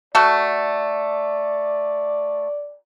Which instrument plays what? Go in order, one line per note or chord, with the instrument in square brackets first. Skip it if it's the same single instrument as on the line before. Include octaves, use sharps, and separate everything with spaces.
[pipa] A3 F#4 A4 [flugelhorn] D5